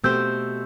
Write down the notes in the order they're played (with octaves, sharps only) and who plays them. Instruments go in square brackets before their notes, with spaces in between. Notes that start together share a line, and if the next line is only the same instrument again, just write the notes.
[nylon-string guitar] B2 A3 C4 G4 C5 [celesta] E6 G6